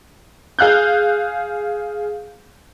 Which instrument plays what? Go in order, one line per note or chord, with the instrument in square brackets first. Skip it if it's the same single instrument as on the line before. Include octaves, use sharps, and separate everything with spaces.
[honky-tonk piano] G#4 F5 F#6 G6